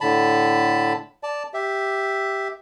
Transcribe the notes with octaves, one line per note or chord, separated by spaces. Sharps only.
A2 D3 A5 B5
D5 A5
G4 E5